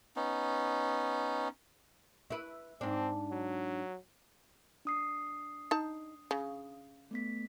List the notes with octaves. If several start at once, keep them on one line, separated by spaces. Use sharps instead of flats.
B3 C#4 D#4
E4 B4
G#2 C4 D4
F#3
D4 D#6 C7
D#4 A5
C#3
A3 B3 B6